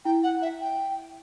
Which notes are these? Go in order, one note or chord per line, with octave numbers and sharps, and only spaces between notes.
E4 G5
F#5
E5
G5